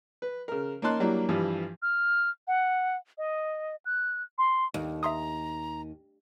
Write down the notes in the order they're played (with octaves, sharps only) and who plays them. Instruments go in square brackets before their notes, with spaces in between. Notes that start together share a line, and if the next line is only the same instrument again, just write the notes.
[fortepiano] B4
C#3 A#4
A#3 C#4 D#4 A5 C6 F#6
F#3 G3 A#3 D4 E4
G2 E3 F3 G3
[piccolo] F6
F#5
D#5
F#6
C6
[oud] D#2
[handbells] E5 C6 D#6 [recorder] A#5